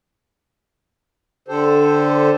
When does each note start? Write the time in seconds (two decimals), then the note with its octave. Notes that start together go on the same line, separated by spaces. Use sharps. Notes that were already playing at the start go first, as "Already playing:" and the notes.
1.48 D3 G4 A4 C5